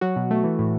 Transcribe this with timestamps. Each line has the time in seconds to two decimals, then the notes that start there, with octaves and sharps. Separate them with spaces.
0.01 F#3 F#4
0.16 B2
0.31 A3
0.44 E3
0.59 A2